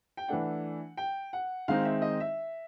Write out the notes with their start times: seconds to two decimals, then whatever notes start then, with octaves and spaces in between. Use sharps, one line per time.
0.17 G5
0.28 E3 A3 D4 F#5
0.97 G5
1.33 F#5
1.68 D#3 G#3 C4 D#4 F5
1.85 E5
2.02 D#5
2.20 E5